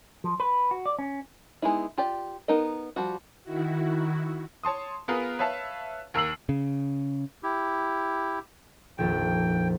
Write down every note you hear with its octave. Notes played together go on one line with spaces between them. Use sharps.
F3
B4
F#4
D5
C#4
G#3 B3 D#4 E4
F4 G4 D5
B3 D#4 A#4 D#5
F3 G3 F#4
D#3 E4 F#4
C#5 A5 C6 D#6
B3 F4 G#4 A#4 B4
B4 C#5 E5 F5 A5
D#2 A#4 E6 C7 F#7
C#3
E4 G4
D#1 A#1 F2 G5